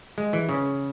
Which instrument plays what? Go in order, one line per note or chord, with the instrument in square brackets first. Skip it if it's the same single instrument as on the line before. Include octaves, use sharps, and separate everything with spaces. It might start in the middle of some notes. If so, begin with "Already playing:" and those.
[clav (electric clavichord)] G#3
E3
C#3